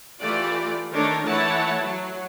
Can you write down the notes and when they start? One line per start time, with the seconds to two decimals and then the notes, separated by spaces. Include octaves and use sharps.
0.21 E3 A3 F4 G4 D5
0.93 D#3 A3 D4 A4 A#4 C#5
1.26 E3 A3 E4 C#5 F#5 A5
1.82 F#3